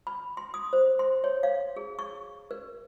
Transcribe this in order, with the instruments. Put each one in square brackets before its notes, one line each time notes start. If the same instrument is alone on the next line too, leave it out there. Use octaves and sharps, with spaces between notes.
[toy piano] B5
C6
D#6
C5
C6
C#5
F5
G#4
C#6
A#4